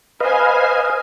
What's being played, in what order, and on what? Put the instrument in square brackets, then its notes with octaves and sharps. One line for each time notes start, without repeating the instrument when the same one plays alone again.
[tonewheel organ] B4 D#5 F5 [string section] C5 G#5